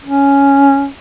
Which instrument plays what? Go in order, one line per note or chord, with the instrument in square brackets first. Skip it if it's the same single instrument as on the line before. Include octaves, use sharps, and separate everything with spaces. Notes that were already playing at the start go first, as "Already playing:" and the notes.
[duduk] C#4